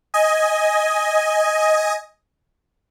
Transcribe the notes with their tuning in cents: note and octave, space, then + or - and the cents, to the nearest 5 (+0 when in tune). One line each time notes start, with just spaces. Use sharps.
D#5 +10 G#5 +0